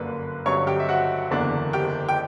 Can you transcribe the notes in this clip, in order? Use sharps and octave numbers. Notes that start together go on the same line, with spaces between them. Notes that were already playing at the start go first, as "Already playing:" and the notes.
Already playing: G1 F#2 D3 A#3 D4 B4
G2 D3 F#3 C#4 C#5 C#6
G4 G5
E5
F#4 F#5
F#1 E2 D3 A#3 D4
G4 G5
G5